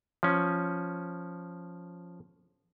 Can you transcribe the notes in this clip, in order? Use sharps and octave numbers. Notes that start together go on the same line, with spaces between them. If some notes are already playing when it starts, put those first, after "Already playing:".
F3 C#4